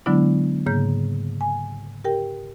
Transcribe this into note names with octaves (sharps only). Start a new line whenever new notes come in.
D3 F#3 G#3 B3 D4 E4
G#2 C#3 A#3 G6
G#5
G4 A#4 G5